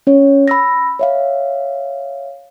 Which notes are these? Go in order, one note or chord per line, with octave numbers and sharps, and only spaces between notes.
C#4 C#5
B5 E6 A#6
C#5 E5 F5